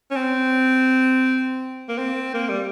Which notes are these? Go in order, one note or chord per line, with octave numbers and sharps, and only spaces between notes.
C#4
C4
A#3
C4
A#3
G3